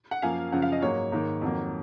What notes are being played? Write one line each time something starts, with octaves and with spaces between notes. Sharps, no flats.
F#5
F#2 F3 A#3 F5 G#5
F#2 C#3 F3 F#5
F5
D#5
G#2 F#3 A#3 C#5
G#2 D#3 A#3
F2 D#3 F#3 A#3